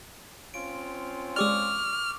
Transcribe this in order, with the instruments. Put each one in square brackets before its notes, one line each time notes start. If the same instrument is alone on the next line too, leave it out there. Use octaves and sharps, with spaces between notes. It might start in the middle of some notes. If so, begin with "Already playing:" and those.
[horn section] C4 C#4 F4 [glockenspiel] D7
[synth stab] G#3 G4 D5 [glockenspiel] C#6 D6 E6 [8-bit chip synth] F6